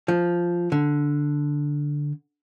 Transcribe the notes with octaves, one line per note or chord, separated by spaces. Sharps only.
F3
D3